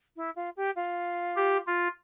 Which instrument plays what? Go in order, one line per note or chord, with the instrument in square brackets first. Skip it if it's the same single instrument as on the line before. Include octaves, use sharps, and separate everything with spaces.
[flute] E4
F4
G4
F4
[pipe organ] G4
F4